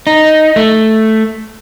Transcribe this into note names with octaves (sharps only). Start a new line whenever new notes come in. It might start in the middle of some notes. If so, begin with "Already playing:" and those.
D#4
A3